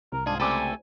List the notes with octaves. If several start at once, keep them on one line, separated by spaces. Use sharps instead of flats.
C2 A#4
G#2 D4 F4 G#4
C#2 A3 C4 G4 A4 D5 G#5